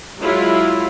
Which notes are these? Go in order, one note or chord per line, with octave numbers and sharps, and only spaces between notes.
F#3 G#3 E4 F4